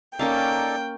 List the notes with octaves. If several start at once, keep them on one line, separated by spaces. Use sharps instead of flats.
A#3 C#4 D#4 A4 D5 F5 G5